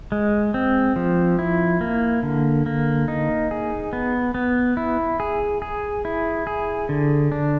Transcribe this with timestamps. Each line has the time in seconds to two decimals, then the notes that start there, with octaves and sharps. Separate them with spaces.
0.12 G#3
0.54 C4
0.96 F3
1.39 E4
1.81 A#3
2.23 D3
2.66 A#3
3.08 D#4
3.51 G#4
3.93 B3
4.34 B3
4.77 E4
5.20 G#4
5.62 G#4
6.05 E4
6.47 G#4
6.89 D3
7.32 D4